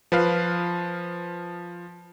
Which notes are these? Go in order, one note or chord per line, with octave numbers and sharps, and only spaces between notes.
F3 B4 F5